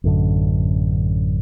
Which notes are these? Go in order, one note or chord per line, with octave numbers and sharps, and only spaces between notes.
A1 F#2 D3